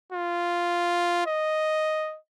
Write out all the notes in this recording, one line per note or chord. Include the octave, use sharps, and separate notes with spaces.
F4
D#5